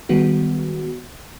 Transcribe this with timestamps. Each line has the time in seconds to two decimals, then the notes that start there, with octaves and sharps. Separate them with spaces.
0.09 D#3 G3 G#3 B3 F#4